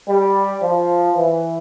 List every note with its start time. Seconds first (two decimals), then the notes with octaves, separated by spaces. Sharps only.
0.09 G3
0.63 F3
1.17 E3